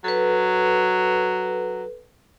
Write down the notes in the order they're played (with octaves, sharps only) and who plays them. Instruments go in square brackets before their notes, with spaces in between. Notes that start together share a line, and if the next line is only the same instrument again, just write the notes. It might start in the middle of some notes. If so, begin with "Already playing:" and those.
[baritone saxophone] F#3 [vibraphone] A4 B4